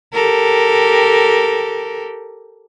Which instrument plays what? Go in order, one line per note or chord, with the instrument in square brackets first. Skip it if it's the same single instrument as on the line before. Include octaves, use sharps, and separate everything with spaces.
[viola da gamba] G4 A4 A#4